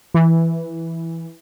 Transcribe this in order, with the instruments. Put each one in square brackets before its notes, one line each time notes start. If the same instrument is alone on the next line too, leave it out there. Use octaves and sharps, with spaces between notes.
[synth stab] E3